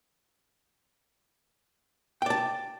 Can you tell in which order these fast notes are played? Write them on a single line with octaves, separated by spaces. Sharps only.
G5 D5 A5